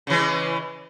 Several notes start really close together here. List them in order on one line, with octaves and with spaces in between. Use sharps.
C#3 E3 G#3